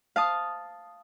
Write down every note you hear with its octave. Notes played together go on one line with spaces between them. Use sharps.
F5 A5 D#6